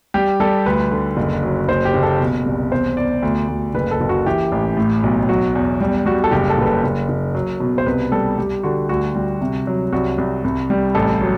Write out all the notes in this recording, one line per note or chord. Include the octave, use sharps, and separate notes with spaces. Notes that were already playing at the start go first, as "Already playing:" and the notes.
G3 G4
G3 A4
D2 B4
D3
F#1
F#3
F#1 C5
G4
F#1
A4
B2
C2
E2 C5
E2 D5
D2
D2
F#1 B4
A4
F#1
F#4
E3 G4
A1
A2
B1
F#3 F#4
E2
G3
G3 F#4
A4
F#1 G4
A4
F#1 B4
A4
F#1
F#1
F#3
B2
C5
C2 B4
G3 A4
G3 G4
D3 F#4
D2 F#4
G3
C3
F#3
C2 F#4
C2
C2
G3
A1 A4
F#3